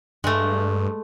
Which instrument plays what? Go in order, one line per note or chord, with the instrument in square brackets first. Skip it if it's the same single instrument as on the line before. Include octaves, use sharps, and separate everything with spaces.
[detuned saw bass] G2 [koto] G#3 A3